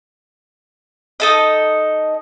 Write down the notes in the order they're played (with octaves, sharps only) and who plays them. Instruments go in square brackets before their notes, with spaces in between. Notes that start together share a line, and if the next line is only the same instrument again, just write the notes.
[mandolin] D#4 A4 D#5